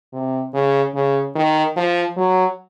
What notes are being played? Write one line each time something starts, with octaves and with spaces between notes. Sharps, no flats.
C3
C#3
C#3
D#3
F3
F#3